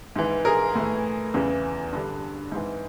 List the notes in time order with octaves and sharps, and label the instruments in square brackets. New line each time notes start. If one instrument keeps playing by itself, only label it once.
[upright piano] G#2 E3
G#4 A#4
A2 E3
E2 C#3 E3
G2 D3
G#2 E3